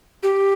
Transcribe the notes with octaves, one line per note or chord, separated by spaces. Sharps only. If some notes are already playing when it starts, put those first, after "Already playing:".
G4